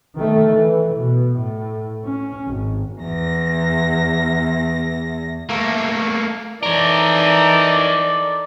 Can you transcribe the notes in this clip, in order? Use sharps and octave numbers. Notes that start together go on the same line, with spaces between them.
D#3 A3
E3
B2
A2
C#4
G#1
E2 A#6
A3 A#3
E3 D#4 A4 A#4 C#5 D5